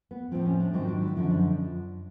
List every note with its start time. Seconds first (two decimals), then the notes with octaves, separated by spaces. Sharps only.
0.11 B3
0.32 A2 F3 C4
0.46 C#4
0.60 D4
0.73 G#2 D#3 F#3 C4
0.88 D4
1.02 E4
1.16 F#2 D3 F3 E4
1.30 D4